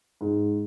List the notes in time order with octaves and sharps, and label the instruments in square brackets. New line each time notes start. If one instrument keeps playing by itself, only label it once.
[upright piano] G#2